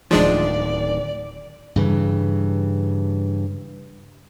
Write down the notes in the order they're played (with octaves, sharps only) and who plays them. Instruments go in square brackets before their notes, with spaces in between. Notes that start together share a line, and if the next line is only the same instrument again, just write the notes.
[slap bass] D1 D#3 [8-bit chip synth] F3 G#3 D4 [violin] D5
[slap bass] G2 C#3 E3